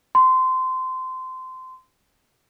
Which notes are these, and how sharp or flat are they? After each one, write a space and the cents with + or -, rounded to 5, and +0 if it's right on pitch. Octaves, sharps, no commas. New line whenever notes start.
C6 -20